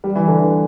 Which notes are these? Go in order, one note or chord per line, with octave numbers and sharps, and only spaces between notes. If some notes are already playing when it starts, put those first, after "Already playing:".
G3
E3
D3
E3